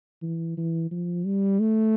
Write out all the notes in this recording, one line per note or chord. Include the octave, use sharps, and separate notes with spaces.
E3
E3
F3
G3
A3